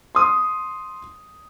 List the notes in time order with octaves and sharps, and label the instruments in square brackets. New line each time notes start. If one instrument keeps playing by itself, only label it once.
[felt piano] C6 D#6